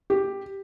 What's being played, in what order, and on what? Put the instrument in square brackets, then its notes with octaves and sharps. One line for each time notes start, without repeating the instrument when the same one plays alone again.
[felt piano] G4